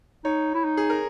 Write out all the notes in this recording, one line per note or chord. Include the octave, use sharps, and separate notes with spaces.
D#4 C#5
E4
D#4
G#4
A#4